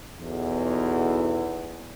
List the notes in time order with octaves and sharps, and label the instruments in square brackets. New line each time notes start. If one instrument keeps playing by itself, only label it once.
[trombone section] B1 E2